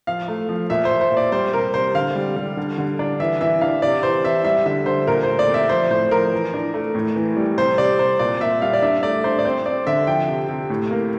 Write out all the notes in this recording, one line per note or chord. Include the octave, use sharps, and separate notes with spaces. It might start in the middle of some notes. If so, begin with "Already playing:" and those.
F3 F5
A3
F3
A#2 E5
C5
A#2
C5
A#2
D5
G3 C5
C3 A#4
C3 C5
D3 F5
G3
G3
D3
D3
D4
E3 E5
E3 E5
D4 F5
C3 D5
E3 C5
E3 E5
G3 E5
D3 E5
D3 C5
A#2 A#4
C5
A3
D5
C4 E5
F3 C5
A2 C5
F3 A#4
E3
D4
A3
A2
E3
G3
C3 C5
C3 D5
C3 C5
A#2 D5
A#2 E5
G3 F5
D5
D4 E5
A3 D5
D4 C5
D5
C4 C5
C4 D5
D3 E5
F3 G5
C3
C3
A2
A#3